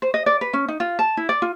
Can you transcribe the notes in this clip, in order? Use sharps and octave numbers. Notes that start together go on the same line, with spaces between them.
C5
D#5
D5
B4
C#4
D#4
F4
A5
E4
D5
F4